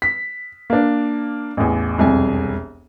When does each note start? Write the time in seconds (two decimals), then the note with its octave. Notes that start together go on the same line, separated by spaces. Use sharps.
0.02 B6
0.70 A#3 D4
1.57 A1 E2
1.98 E1 C2 F2 G#5